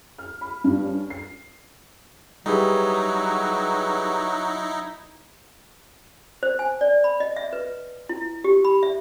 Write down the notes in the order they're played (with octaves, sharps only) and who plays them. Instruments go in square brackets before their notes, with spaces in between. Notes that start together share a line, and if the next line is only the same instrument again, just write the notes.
[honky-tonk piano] F6
B5
G2
C#4
C7
[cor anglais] F#3 [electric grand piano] G3 G#4 B4 [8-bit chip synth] D#4 E4
[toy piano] C5
G#5
D5
B5
D#5
E5
B4
E4
G4
B5
E5